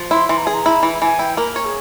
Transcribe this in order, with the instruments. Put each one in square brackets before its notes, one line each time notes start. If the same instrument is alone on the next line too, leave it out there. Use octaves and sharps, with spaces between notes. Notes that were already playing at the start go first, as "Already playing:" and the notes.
Already playing: [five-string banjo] F3
[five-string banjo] E4 [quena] C6
[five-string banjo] E3 [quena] C6
[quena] A#5
[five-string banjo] G#4 [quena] G#5
[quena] A#5
[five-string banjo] E4
E3
[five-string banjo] E3 [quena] G#5
[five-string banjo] E4 [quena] G5
[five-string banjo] A#3 [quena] A#4
[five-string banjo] C#5
[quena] G#4